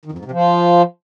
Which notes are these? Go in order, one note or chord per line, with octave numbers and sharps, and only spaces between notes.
D#3
F2
G#2
C3
F3